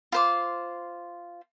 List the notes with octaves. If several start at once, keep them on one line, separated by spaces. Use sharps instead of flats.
F4 C5 D6